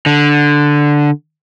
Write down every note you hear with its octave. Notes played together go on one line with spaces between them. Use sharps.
D3